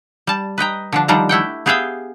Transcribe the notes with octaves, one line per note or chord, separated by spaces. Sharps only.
G3 A5
B4 D#5 G5 A#5
D3 F3 D4
D3 D#3 F3 G3 D4 A#5
A3 E4 F#5 G5
B3 G4 G#4 E5 F5 G5